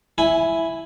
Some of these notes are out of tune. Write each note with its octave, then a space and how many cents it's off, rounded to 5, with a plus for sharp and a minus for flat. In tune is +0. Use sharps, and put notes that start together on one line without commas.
E4 +0 G#5 +0